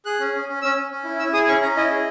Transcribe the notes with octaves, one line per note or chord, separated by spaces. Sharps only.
G#4 F#6
C#4
C#4
C#4
C#4 E6
C#4
C#4
E4
E4 E6
G#4 D#6
C#4 C#6
C#4 A#5
E4 D#5
G#4